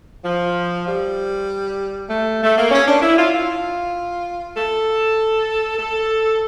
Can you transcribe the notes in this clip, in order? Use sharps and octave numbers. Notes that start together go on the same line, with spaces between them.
F3
G3
A3
A3
A#3
C#4
D4
E4
F4
F4
A4
A4